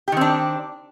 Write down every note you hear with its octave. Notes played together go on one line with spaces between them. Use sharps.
D#3 C4 D4 G4